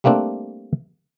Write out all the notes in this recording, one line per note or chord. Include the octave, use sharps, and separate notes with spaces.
G3 A3 A#3 C4 D4